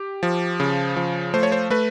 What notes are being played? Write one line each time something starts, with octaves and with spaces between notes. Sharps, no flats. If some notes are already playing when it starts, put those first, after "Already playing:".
Already playing: G4
F3
C#3
F3
A3 C5
C#5
C5
A3 B4